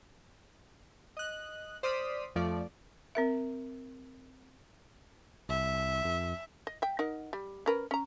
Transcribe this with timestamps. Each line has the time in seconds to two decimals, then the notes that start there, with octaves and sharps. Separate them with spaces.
1.17 D#5 F#6
1.83 C5 D5 D#6 F6 B6
2.35 F2 F3 A3 D5
3.15 C4 A#4 E5
5.49 C2 E5
6.05 F2
6.67 D#5
6.82 E5 G5
6.99 D#4 A#4 F#5
7.33 G3
7.66 C#4 A#4 B4
7.91 C#4 A#5